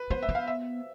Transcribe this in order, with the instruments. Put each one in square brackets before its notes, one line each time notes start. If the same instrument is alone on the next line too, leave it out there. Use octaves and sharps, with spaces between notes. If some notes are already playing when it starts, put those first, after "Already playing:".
Already playing: [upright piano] B4
[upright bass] B3 [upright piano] C5
[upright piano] E5
[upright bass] B3
[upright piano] F5
E5